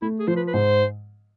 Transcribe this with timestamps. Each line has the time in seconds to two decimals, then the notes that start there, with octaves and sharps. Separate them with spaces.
0.02 A3 E4
0.19 G#4
0.27 F3 C5
0.36 B4
0.48 B4
0.54 G#2 C5